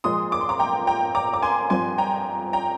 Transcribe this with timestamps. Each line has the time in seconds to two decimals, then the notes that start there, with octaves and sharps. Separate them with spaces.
0.04 A#2 F3 G#3 C6 D#6
0.32 D6
0.41 C6
0.49 A#5 D6
0.59 G5 A#5
0.87 G5 A#5
1.15 A#5 D6
1.34 D6
1.42 G#5 C6
1.70 G2 F3 C4 G#5 C6
1.98 G5 A#5
2.53 G5 A#5